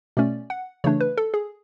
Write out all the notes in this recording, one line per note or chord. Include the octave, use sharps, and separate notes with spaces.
B2 A3 C#4 D5
F#5
C#3 E3 A3 D4 C#5
B4
A4
G#4